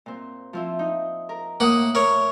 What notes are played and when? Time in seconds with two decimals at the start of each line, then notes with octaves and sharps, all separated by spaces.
0.06 A#2 C4
0.53 F3 C4 E4
0.79 D#4
1.29 A#4
1.60 A2 A#3 F#5 D#6
1.95 A2 A#4 C#5